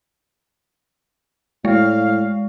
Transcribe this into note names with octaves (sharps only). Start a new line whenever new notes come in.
A2 G#3 F5